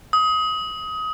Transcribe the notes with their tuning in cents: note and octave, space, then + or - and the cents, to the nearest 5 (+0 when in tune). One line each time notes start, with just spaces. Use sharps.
D#6 +25